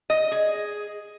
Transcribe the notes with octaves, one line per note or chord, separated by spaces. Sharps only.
D#5
G#4